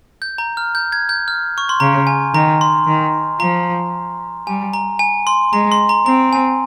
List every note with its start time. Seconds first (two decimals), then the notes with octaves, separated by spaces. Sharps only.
0.22 G6
0.38 A#5
0.57 F6
0.75 G6
0.92 G#6
1.09 G6
1.28 F6
1.58 C#6
1.69 C6
1.80 C#3 A#5
2.07 G#5
2.34 D#3 A#5
2.61 C6
2.87 D#3
3.40 F3 A#5
4.47 G3 G#5
4.73 A#5
4.99 G#5
5.27 C6
5.53 G#3 A#5
5.72 C6
5.89 A#5
6.06 C4 A#5
6.33 G#5